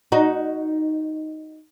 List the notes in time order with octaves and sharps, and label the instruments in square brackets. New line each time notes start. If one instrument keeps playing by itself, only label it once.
[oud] D#4 F#4